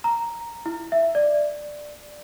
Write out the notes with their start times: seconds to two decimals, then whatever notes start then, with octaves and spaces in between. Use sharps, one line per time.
0.04 A#5
0.66 E4
0.92 E5
1.15 D5